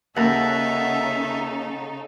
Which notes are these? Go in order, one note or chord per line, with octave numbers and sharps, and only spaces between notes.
D#2 C#3 D#4 A4 E5 F#5 A5 A#5